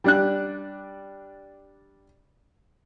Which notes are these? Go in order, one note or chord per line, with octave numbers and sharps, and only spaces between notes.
G3 D4 F#6